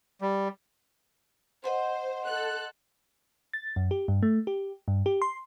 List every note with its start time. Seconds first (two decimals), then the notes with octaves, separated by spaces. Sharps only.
0.21 G3
1.64 C5 D#5 F#5 C6
2.26 A4 F#6
3.53 A6
3.76 F#2
3.91 G4
4.08 G2
4.23 A3
4.47 G4
4.88 G2
5.06 G4
5.22 C6